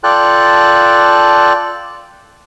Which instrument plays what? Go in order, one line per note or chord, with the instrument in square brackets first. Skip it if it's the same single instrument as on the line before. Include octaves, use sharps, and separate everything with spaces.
[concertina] F4 A4 D5 G5 A5 F#6